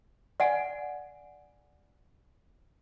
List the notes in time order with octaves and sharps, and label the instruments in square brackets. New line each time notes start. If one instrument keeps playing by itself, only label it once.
[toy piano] D5 F#5 G#5